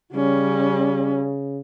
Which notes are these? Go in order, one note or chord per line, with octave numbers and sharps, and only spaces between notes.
C#3 G3 C#4